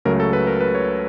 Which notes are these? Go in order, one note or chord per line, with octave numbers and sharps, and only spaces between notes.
C#2 C#3 F#3 A3 A#4
A4
B4
A#4
B4
C#5